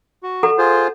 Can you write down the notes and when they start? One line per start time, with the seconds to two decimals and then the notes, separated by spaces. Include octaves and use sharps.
0.23 F#4
0.43 A4 F#5 A#5
0.58 F4 G#4 C5